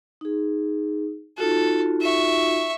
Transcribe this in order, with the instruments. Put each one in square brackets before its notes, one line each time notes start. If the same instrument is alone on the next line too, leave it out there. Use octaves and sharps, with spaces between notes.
[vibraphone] D#4 G#4
[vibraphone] D#4 F4 F#4 [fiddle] A4
[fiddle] E5 C#6